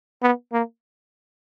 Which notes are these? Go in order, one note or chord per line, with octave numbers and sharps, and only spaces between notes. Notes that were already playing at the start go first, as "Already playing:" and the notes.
B3
A#3